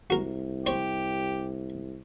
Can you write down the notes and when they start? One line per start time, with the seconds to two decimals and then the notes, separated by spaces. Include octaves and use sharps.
0.10 C2 F#4 A#4
0.66 G4 C5 C#5